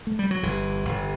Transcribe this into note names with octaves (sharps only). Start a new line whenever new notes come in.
A3
G3
F#3
G1 E3
G1